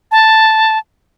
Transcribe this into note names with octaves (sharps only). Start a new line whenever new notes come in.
A5